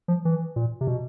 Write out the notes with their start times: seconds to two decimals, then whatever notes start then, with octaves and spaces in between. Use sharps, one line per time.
0.08 F3
0.25 E3
0.56 A#2
0.81 C3
0.87 B2